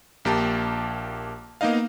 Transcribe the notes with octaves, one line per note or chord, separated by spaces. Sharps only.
A#1 A#3 G4 A5
A#3 B3 D#4 D#5 F5